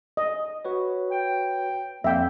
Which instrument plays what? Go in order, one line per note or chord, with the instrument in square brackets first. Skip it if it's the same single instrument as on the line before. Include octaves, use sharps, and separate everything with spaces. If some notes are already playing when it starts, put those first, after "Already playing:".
[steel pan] D#5
[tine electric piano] F#4 B4 C#5
[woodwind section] G5
[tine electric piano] F2 [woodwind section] G3 A#3 [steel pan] E5 G5